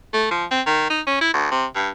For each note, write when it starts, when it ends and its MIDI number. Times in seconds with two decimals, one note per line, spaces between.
0.14 0.31 57
0.31 0.45 53
0.51 0.61 60
0.66 0.86 51
0.90 1.01 63
1.07 1.17 61
1.21 1.33 64
1.34 1.50 38
1.51 1.66 48
1.75 1.89 43